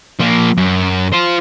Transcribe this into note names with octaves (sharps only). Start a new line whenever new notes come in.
F3 A#3
F#2
F4 C5